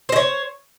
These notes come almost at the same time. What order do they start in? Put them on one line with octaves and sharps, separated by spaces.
C5 D#5 C#5